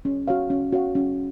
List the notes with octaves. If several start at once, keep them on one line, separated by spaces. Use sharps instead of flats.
C#4
F#4 C#5 F5
C#4
F#4 C#5 F5
C#4